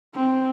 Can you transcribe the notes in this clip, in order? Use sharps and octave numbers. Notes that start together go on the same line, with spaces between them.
C4